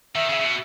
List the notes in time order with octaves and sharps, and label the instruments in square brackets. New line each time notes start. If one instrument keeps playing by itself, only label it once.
[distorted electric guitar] D#3 [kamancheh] E5
[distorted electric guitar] C#3
C#3
B2